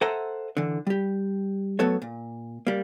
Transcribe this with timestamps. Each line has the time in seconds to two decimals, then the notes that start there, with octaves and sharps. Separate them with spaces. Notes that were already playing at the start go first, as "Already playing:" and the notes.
0.01 A4 C5 E5 F#5 G#5 A#5
0.57 D3 E3
0.87 G3 G4
1.79 F#3 A3 B3 A4 C#5
2.02 A#2
2.67 G3 A#3